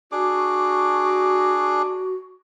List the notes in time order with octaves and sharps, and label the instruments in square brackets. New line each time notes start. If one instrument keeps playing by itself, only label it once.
[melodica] D4 G#4 D6 [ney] F#4